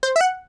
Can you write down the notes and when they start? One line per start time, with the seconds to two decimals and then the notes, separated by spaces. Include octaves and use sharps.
0.03 C5
0.16 E5
0.21 F#5